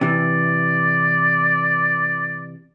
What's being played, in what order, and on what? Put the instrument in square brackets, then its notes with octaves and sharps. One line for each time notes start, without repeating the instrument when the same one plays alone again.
[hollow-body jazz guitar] C3 E3 [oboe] D5